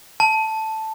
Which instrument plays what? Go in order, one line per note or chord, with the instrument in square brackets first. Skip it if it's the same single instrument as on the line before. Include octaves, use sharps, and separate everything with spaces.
[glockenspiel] A5